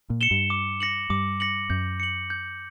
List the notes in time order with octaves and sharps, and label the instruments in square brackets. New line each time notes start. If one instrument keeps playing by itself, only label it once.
[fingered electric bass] A#2
[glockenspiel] C#7 E7 G7
[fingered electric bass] G2
[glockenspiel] D6
A#6 C#7 F#7
[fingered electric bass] G2 [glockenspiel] D6
[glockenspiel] A#6 C#7 F#7
[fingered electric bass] F#2 [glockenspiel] G6
[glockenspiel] C#7 F#7
G6